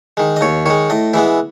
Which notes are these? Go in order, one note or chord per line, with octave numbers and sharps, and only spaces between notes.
D#3 G#3
D#5
D#2 C#5
D#3 G#3 C#5
A2 D#5
E3 G#3 B3 E5